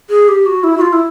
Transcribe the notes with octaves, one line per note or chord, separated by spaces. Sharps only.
G#4
G4
F#4
E4
F#4
F4
E4